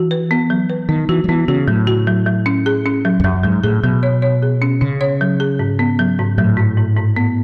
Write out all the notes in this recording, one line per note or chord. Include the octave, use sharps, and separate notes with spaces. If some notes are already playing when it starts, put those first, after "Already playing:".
Already playing: E3 F#4
B4
B3
F#3
B4
D#3 B3
E3 F#4
F#3
E3 B3
C#3 F#4
A2 F#3
F#4
F#3
F#3
C#4
G#4
C#4
F#3
E2
F#2 F#3
G#2 F#3
A2 G#4
B2 F#3
C#5
C#5
G#4
C#4
C#3 C#4
C#5
F#3
G#4
G#2
B3
F#3
G#2
A2 F#3
G#2
G#2
G#2
B3